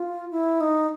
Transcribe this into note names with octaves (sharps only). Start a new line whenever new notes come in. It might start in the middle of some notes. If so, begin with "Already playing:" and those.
Already playing: F4
E4
D#4